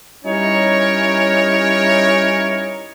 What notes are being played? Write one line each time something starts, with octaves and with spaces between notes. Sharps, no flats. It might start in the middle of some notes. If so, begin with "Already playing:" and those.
G3 C#4 D#4 E4 A#4 C#5